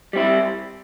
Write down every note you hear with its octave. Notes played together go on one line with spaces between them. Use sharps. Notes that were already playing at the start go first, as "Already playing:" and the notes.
G3 C4 E4